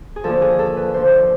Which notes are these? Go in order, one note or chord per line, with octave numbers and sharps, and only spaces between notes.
G#4
D#2 D3 F3 A4
G#4
A4
B4
D#2 D3 F3 C5